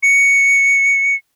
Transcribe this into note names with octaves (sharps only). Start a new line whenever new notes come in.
C#7